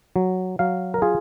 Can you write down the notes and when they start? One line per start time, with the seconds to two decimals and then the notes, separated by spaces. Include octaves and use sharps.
0.16 F#3
0.59 F#3 F5
0.94 A#4
1.02 F4 G#4